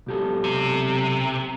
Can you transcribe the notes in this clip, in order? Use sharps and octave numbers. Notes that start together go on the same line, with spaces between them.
B1 G4 A4
C3